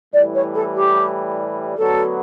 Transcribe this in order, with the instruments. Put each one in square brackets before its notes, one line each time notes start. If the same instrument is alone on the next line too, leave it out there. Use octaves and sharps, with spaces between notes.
[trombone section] A2 E3 G3 [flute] D5
[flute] C#5
A4
G4
[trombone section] D2 D3 F#3 B3 [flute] A4